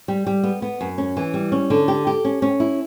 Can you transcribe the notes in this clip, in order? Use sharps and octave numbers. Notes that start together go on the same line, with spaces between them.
G3
G3
B3
B3
F#2
C#4
E3
G3
C#4
D3
G4
G4
C#4
C#4
E4